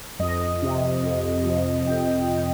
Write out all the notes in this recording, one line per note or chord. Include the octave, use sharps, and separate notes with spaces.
F2 D#5
C3
F2
F3
F2 G5